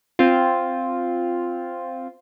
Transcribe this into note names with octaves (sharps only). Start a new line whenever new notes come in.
C4 F4